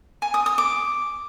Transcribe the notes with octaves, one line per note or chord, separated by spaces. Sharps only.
G#5
D#6
D#6
D6